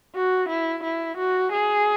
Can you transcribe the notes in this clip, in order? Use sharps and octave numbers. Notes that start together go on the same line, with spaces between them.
F#4
E4
E4
F#4
G#4